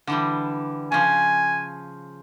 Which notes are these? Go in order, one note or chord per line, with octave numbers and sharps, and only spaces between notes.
D3 E3 G3
C#3 F3 G#5